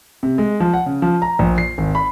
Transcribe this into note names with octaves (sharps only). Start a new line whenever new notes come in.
C3
G#3
F3
F#5
C#3
F3
A#5
A#1
C7
G#1
B5